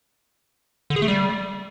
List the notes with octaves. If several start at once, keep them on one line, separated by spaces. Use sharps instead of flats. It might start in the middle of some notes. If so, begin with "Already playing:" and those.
D3
G#4
A3
G3